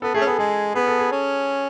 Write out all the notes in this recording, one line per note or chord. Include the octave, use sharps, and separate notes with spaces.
B3 A4
A3 G#4
C#4
B3 A4
G#3 G#4
B3 G#4
A4
G#4
C#4